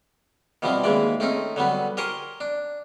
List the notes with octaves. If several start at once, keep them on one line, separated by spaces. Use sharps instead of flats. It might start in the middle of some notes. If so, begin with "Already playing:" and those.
B2 E3 F3 G3 C4
D#2 E3 G#3 D5
A3 C4 C#4 D#4
D3 F#3 G3 B3
G4 A#4 C5 G#5 A#5 C#6
D4